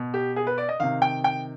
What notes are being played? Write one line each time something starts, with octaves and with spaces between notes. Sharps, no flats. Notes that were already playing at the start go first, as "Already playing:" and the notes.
Already playing: B2
G4
G#4
B4
D5
D#5
C3 D#3 F5
G5
G5